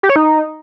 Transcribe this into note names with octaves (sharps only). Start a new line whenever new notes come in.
G4
C#5
D#4